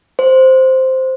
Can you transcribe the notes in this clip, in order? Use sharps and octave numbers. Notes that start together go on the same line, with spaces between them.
C5